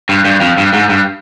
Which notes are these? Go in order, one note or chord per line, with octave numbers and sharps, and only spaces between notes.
G2
G2
F2
G2
G#2
G2